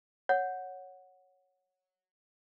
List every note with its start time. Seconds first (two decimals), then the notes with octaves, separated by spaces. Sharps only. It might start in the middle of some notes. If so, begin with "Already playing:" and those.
0.29 C#5 F#5